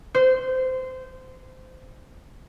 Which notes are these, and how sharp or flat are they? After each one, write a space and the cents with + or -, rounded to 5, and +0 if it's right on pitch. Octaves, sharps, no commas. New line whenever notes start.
C5 -20